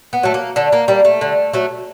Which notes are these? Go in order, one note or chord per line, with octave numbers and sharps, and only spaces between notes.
B3
F#3 A3
A#3
D3 A3
A#3
G3 A#3
A3
D3
F#3 A3